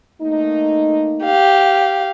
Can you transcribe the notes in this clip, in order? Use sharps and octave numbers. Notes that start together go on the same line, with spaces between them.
A3 A#3 D#4
G4 F5